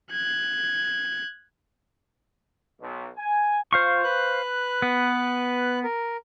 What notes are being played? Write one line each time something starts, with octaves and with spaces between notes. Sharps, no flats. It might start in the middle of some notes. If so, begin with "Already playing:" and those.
F#6 G#6
B1
G#5
F4 C5 F5 C#6
B4 F#6
B3
A#4